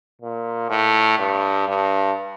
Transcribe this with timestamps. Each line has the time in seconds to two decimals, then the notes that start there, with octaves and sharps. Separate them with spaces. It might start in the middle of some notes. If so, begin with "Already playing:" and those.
0.22 A#2
0.70 A2
1.19 G2
1.68 G2